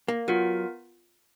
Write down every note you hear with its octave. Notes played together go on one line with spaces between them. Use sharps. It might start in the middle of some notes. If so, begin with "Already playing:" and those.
A#3
F#3 B3 F4 A#4